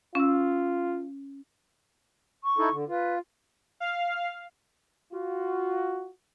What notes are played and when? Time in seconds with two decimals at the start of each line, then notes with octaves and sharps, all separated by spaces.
0.15 C#4 F4 E6
2.43 C#6
2.58 D#4 E4 A4
2.72 D3
2.88 F4 B4
3.80 F5
5.13 F4 F#4